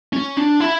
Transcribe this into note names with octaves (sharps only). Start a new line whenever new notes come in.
C#4
D4
E4